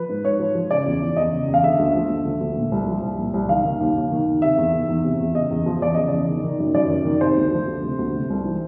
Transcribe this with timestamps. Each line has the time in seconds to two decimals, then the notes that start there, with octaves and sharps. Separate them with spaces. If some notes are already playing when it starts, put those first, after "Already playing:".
Already playing: F3 B4
0.09 G#2
0.24 G#2 C#5
0.39 F3
0.55 F3
0.70 C#3 D5
0.86 E2
1.02 E3
1.16 E2 D#5
1.32 C#3
1.48 E2
1.54 F5
1.63 D3 E5
1.79 D2
1.95 F3
2.09 D2
2.25 D3
2.40 D2
2.57 A#2
2.72 C2
2.88 F3
3.03 C2
3.18 A#2
3.34 C2
3.49 D#3 F5
3.65 D#3
3.80 D#2
3.96 D#2
4.11 D#3
4.27 D#3
4.42 C3 E5
4.58 E2
4.73 D#3
4.89 E2
5.04 C3
5.20 E2
5.35 C#3 D#5
5.51 E2
5.66 F3
5.81 E2 D5
5.95 C#3 D#5
6.09 E2 D5
6.28 D#3
6.44 D#3
6.59 F#2
6.75 F#2 D5
6.90 D#3
7.05 D#3
7.21 C3 C5
7.37 D2
7.52 F3
7.67 D2
7.83 C3
7.99 D2
8.15 C3
8.30 C2
8.45 E3